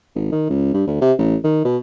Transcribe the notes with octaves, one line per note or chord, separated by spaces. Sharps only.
G#1
D#3
C#2
G2
D2
C3
A1
D#3
B2